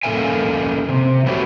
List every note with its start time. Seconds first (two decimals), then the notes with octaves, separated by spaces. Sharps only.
0.03 A#3 C#4 A4 A#4 E5 G#5
0.89 C3
1.26 F#3 A3 B3 C#4 F#4 G4